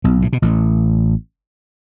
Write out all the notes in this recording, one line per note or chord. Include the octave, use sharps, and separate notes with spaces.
B1 B2
A2
B2
A1 A2